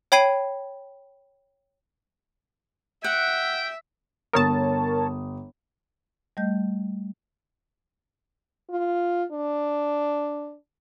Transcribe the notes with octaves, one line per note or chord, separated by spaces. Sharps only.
C#5 G5 B5 G#6 C7 D#7
E5 F#5 G5
G1 A#4 C#5 A5 D#6
G3 A3 D#5 G6
F4
D4